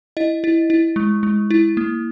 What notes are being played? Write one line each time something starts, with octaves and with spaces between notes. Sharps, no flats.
E4 D#5
E4
E4
G#3
G#3
E4
A#3